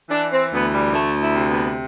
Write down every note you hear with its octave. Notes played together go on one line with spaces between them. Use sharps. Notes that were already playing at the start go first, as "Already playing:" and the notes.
E3 D4
C4
D2 B3
G3
D2 A3
E4
C3
B3